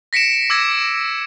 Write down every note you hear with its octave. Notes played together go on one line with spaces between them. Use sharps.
A#6 B6 C#7 D7 E7
D6 E6 G#6 A#6